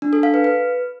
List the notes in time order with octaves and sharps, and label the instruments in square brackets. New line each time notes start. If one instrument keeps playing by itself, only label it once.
[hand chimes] D4
A4
F5
B4
B4